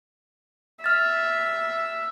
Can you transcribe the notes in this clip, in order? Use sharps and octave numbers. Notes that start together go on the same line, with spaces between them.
E5 F6 A6